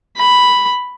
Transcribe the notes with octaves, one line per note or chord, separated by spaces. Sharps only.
B5